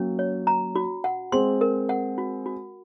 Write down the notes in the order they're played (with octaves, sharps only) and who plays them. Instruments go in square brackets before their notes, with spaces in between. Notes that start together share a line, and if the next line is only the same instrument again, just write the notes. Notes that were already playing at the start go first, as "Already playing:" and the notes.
Already playing: [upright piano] F#3 A#3 [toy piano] C#4
[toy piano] C#5
A#5
F#4
F#5
[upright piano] G#3 C4 [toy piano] C6
[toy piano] A#4
F#5
F#4
F#4